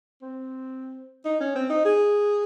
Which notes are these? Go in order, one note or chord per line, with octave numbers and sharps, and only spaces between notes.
C4
D#4
C#4
C4
D#4
G#4